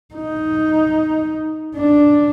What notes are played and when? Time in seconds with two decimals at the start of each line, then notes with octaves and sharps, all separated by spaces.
0.15 D#4
1.77 D4